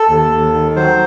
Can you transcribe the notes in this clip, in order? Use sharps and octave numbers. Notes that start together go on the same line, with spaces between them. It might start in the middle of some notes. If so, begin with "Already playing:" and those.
Already playing: A4
D#2
D#2
D#3
F#3 C5